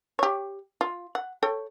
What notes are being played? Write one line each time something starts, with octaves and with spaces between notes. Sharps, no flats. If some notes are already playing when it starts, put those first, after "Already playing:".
G4 C#5
F4
F#5
A4 C#5 G5